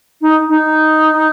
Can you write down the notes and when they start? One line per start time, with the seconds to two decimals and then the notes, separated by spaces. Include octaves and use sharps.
0.21 D#4
0.49 D#4